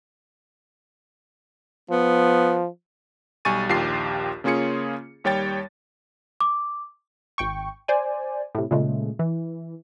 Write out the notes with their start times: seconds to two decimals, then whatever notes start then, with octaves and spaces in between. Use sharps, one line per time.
1.90 F3 B3
3.45 B1 G3 G#5 C#6 A6 D#7
3.69 A#1 D#2 F4 G4 G5 C7
4.44 C#3 A#3 C#4 F4 G#4 C#7
5.24 D#2 G3 C#5 G5 A6
6.41 D6
7.38 G#1 G5 C#6
7.88 C5 D5 G#5
8.55 A2 C3
8.71 A#2 C#3 G#3 A3
9.19 E3